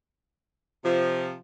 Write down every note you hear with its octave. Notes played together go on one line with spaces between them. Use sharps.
C3 F3